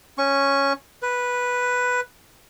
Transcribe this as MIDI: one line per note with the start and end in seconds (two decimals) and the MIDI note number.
0.18 0.73 61
0.18 0.73 85
1.02 2.01 71